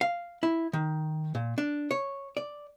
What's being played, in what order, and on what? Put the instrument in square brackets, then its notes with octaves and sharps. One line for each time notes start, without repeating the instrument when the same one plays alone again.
[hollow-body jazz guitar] F5
E4
D#3
A#2
D4
C#5
D5